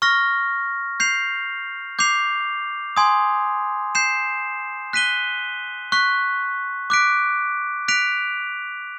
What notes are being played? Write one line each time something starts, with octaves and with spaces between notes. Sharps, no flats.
C#6 F6 A#6
G6 C7 F7
D6 G6 C7 F7
G#5 C6 D#6 G#6
G6 C7 E7
F#6 B6 D#7 G7
C#6 F#6 B6
D6 F#6 B6 D7
F#6 B6 D7 F7